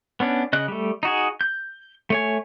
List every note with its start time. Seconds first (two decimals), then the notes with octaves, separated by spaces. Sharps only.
0.20 B3 C#4 D4
0.53 C#3 D#5 F#6
0.68 G3 A3
1.03 D#4 F#4 G#4
1.41 G6
2.10 A3 C#5 G#5